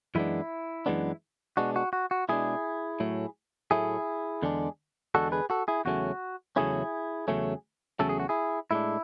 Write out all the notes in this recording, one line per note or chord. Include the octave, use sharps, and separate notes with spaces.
F#2 E3 G#3 B3 D4 E4
F#2 E3 G#3 B3 D4
B2 G#3 D4 F#4
F#4
F#4
F#4
B2 G#3 D4 E4 G#4
A2 F#3 A3
A2 F#3 A3 E4 G#4
E2 D3 G#3 D4
E2 D3 G#3 D4 F#4 A4
G#4 B4
F#4 A4
E4 G#4
E2 C#3 F#3 A3 C#4 F#4
E2 C#3 F#3 A3 C#4 E4 G#4
E2 C#3 F#3 A3 C#4
E2 C#3 F#3 A3 C#4 A4
G#4
F#4
E4 G#4
A2 G#3 D4 E4